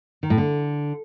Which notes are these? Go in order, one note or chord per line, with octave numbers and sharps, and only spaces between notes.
D#3
A2
D3